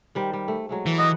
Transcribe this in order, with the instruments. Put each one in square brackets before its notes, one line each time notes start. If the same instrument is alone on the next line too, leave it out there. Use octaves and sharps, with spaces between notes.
[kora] D#3 G3 C5
G3
A3
F#3 G#3 A3
[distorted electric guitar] E3
[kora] B4 F#5 [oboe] D#5